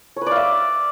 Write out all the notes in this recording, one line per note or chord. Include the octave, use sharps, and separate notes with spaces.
C#5
B4
D5
F5
E5